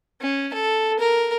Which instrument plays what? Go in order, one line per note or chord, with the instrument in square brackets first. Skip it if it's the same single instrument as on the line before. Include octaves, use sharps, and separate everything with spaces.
[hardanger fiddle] C#4
A4
A#4